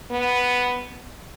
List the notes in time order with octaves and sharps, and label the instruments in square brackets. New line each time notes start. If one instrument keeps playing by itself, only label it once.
[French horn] B3